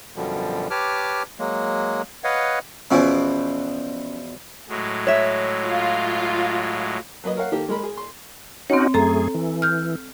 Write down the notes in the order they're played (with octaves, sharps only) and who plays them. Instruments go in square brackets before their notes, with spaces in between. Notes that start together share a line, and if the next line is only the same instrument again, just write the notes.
[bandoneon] F#2 B2 D3 F3 G3
G4 B4 C#5 A5 D6 F6
F#3 G#3 A#3
B4 C#5 D#5 F5 F#5
[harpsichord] E2 B2 F3 [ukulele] C#4
[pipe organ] A2 F#3 G#3
[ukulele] C#5 E5
[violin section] F4
[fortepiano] F#3 A#3 B4 D#5
A#4 C#5 F5 F#5
D#3 A#3 G4 A4 A#4
G#3 A#4 B5
G#4
C6
[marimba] C4 C#5 [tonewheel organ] C#4 D#4 F#4
[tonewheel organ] F#2 A3 G#4 [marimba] A4 A#5
[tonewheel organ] E3
[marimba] F6 G6